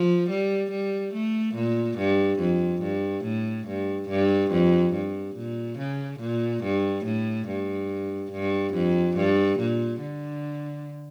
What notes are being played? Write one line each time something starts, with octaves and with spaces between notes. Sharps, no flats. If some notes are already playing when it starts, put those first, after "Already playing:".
Already playing: F3
G3
G3
A3
A#2
G2
F2
G2
A2
G2
G2
F2
G2
A#2
C#3
A#2
G2
A2
G2
G2
F2
G2
A#2
D3